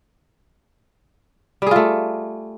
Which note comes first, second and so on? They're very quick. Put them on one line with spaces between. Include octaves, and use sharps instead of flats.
G3 G#4 F4 A3